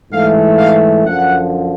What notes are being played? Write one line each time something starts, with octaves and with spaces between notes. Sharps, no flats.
G#2 E3 A3 F5
F5
F#2 D3 F3 F#5